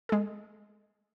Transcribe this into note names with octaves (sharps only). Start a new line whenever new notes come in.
G#3 A4